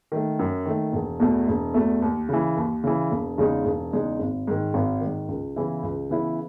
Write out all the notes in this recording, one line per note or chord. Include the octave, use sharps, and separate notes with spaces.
D#3 A3
F#2
D#3 A3
E1
E2 B2 A3
E1
E2 B2 A3
D#2
C#3 E3
D#2
C#3 E3
E1
E2 C#3 G#3 D#4
E1
E2 C#3 G#3 D#4
G#1
G#2 D#3
G#1
D#3
G#2
C#2
C#3 E3 B3 E4
C#2
C#3 E3 B3 E4